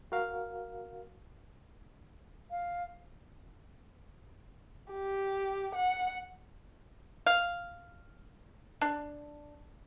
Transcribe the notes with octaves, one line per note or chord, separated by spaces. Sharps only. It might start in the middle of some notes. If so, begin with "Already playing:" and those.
F#4 A#4 F5
F5
G4
F#5
F5
D4